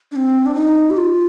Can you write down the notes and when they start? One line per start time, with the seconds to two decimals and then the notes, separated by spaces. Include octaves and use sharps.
0.12 D4
0.16 C4
0.46 D4
0.55 D#4
0.90 G4
0.97 F4